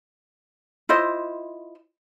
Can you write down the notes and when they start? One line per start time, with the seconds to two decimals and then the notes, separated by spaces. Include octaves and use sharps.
0.89 E4 F4 C5 D#5